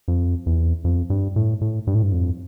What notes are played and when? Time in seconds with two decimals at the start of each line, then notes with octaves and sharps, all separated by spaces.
0.08 F2
0.46 E2
0.84 F2
1.10 G2
1.36 A2
1.61 A2
1.87 G2
1.95 A2
2.03 G2
2.12 F2